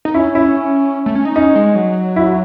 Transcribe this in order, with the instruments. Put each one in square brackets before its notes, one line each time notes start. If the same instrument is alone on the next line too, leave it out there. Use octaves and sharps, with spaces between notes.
[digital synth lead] D#4
[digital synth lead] C#4 [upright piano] E4
[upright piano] E4
[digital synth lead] A3
C#4
D#4
[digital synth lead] C#4 [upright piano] D#4
[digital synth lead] G#3
F#3
[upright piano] E4
F#4